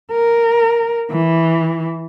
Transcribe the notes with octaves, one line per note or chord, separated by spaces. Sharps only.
A#4
E3